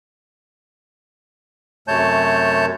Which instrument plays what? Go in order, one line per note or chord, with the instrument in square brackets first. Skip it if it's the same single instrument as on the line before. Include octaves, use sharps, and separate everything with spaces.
[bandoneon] F#2 C3 A3 C#5 A5 G6